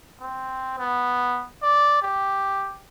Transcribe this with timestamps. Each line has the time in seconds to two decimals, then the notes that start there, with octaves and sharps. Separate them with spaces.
0.21 C4
0.79 B3
1.63 D5
2.03 G4